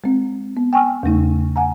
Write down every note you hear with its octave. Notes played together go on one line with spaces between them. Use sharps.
G#3 C4
B3
G5 G#5 C#6 E6 F6
E2 C#3 A3 D#4
F#5 G#5 A#5